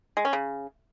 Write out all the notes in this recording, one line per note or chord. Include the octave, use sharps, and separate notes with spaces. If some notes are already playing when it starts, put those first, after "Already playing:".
G#3
C#4
C#3